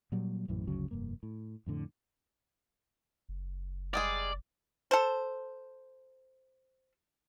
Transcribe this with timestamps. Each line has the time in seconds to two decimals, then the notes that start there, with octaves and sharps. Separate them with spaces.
0.12 A#2 F#3 G3
0.48 A#1 F#2 A2 E3
0.67 G1 D2 C#3 F#3
0.91 F1 G2 A#3
1.23 A2
1.66 F2 A2 D3
3.29 F#1
3.94 G3 G#3 G#4 D5
4.91 A4 C5